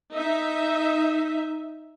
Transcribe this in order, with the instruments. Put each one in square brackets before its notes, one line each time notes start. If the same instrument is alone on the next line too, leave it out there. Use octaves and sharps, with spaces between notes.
[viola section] D#4 E5